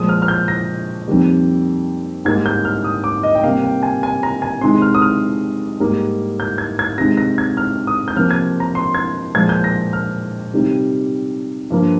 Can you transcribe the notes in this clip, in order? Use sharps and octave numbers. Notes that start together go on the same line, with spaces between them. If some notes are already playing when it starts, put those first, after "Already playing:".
Already playing: A#2 F3 G#3 D#6
F6
F6
G6
A#6
F2 D#3 G3 A#3
G#2 G3 A#3 G#6
G6
F6
D#6
D6
D#5
G5
C3 G3 A#3 F5
G5
G#5
G#5
A#5
G#5
C3 D#3 G#3 C6
F6
D#6
F6
G#2 G3 A#3
G6
G#6
G#6
C3 D#3 G#3 A#6
A#6
G#6
F6
D#6
G6
C3 F3 A#3 F6
G#6
A#5
C6
G#6
A#2 F3 G#3 G#6
G6
A#6
F6
C3 D#3 G3
G2 F3 A#3